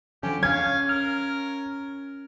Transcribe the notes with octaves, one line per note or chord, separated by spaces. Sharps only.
D3 F3 F#3 C#4 G4 G#5
C#4 C#5 F5 G#6
A#4 F6